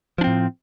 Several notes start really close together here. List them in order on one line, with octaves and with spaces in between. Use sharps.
F3 D4 C4 A2